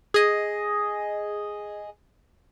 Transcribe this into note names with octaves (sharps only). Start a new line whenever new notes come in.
G#4 D#5